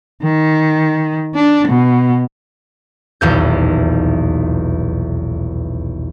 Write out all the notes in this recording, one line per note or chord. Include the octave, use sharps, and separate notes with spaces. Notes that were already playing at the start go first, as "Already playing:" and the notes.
D#3
D4
B2
D#1 B1 E2 G6